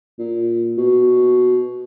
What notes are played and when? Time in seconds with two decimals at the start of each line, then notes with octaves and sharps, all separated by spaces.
0.19 A#2
0.77 B2